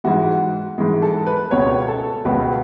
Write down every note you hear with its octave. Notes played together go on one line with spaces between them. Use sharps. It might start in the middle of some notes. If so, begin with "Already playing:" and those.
G#2 E3 G#3 F#4
G#2 E3 G#3
A4
B4
C#2 B2 G#3 B3 C#5
A4
C#2 B2 G#3 B3 B4